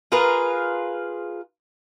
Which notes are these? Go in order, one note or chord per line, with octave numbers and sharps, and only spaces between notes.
F4 G#4 A#4 B4